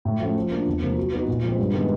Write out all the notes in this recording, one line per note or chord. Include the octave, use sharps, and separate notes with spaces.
A2
F3 A3 C#4
F3
A#3 D4 F4
E2
C3 F3 A#3
F#3
B3 D#4 F#4 B4
A#2
F3 G#3 C4
G2
D#3 G#3 B3 E4